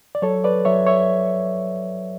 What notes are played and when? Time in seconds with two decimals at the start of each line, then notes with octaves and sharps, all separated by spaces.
0.15 D5
0.22 F#3 A4 C#5
0.44 B4 D5
0.65 F#3 C#5 E5
0.87 C#5 E5